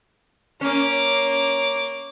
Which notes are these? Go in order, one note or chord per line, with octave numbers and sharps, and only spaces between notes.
A#3 C#4 D6